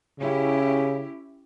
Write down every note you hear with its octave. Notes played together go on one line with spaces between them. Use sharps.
C#3 C#4 E4 G4